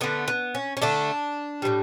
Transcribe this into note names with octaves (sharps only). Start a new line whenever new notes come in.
D3 A3 B3
B3
C#4
C#4
D3 A3 D4
A2 E3 G3